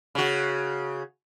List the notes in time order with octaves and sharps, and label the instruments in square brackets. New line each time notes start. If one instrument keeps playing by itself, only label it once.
[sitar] C#3 F#4